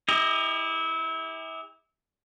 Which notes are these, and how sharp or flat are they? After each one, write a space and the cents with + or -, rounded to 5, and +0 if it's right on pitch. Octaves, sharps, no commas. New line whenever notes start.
E4 -25 G4 +40 D#5 +0